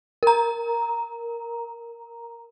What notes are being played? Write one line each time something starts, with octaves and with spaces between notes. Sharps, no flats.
A#4 A#5